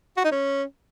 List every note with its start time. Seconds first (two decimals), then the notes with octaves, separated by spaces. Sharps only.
0.17 F#4
0.24 D#4
0.32 C#4